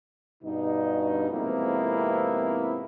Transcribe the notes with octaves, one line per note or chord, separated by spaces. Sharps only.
G2 B2 D#4
F2 G#2 C3 A#3 B3 E4